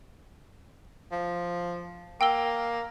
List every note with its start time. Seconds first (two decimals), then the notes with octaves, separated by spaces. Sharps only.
1.12 F3
2.21 A#3 G5 E6 G7